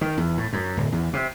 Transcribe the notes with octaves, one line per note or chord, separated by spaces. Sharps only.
D#3
E2
A2
F#2
D1
E2
C3